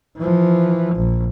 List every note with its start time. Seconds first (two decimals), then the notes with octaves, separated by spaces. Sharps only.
0.17 E3 F3
0.94 A#1